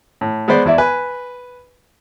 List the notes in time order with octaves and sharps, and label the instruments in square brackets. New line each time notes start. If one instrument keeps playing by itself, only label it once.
[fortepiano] A2
G#3 B3 B4 C5 D5
E2 E4 D5 E5
B4 G#5